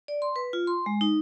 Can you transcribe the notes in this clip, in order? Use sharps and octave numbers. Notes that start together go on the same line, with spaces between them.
D5
C6
B4
F4
C6
G#3
D#4